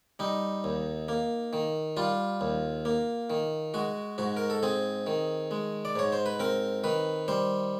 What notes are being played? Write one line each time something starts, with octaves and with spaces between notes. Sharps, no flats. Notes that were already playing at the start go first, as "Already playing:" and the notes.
G3 D#4
D#2
A#3
D#3
G3 F4
D#2
A#3
D#3
G#3 F#4
G#2 F#4
A#4
A4
C4 G#4
D#3
G#3
D5
G#2 C#5
C5
B4
C4 A#4
D#3 B4
G3 C5